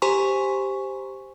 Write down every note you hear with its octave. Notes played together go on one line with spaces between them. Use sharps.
G4 C5 G#5 A#5 C6 C#6